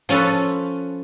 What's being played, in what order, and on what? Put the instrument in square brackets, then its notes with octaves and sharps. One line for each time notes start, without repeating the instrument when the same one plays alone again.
[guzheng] F3 C#4 F4 A4 B4